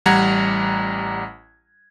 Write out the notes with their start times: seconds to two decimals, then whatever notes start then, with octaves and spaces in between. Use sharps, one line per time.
0.06 A1 G3 F#5 A#5 G#6